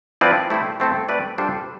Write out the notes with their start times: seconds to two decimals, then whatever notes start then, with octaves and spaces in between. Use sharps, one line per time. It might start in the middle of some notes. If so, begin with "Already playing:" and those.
0.21 F3 C4 E4 B4 D5
0.50 A3 E4 G4 C5
0.80 A3 C4 E4 A4
1.09 A3 C4 G4 B4 D5
1.38 G3 D4 F4 A4 C5